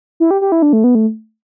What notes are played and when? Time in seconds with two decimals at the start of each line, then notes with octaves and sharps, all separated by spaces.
0.20 E4
0.31 G4
0.41 G4
0.52 E4
0.62 D4
0.73 A3
0.84 B3
0.95 A3